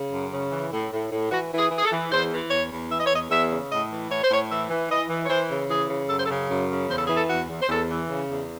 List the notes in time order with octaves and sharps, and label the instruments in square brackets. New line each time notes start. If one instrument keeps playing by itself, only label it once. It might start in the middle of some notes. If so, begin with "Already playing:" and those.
Already playing: [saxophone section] C#3
F#2
C#3
E3
A2
A2
A2
E3 F#4
E3
G#4
E3
G#4
A4
E3
E2 C5
E3
E2 C#5
E2
E3 E5
D#5
C#5
E2 D#5
E2 E5
C#3
A2 D#5
E3
A2 C#5
C5
A2 C#5
E3 E5
E3
E3 D#5
E3
C#5
E3 C5
C#3
E3 G#4
C#3
F#2 A4
C5
A4
C#3
F#2
C#3
E2 C5
A4
E3 G#4
A4
E2 F#4
E2
C5
E2 A4
E3
C#3
E2